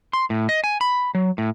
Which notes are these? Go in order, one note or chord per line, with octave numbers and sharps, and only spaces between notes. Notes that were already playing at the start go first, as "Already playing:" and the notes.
C6
A2
D#5
G#5
B5
F#3
A2